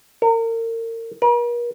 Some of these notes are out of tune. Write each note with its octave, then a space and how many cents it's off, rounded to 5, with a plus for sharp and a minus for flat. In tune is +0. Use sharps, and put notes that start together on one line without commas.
A#4 -35
A#4 +45